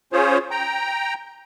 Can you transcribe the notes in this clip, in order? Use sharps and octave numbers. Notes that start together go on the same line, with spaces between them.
C#4 F4 G#4 C5 C#5
G5 A#5